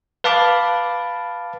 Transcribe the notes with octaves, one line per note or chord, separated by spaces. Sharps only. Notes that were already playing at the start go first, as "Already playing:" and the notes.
B4 F5 A5 B5 D6